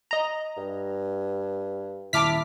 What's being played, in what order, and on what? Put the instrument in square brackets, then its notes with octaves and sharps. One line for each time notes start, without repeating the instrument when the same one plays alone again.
[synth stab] D#5 A#5
[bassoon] G2
[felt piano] D#1 A5 [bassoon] E4 [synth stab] D6 F6 B6